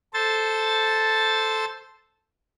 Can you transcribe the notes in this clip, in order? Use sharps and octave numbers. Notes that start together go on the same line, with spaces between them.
A4 C5 A6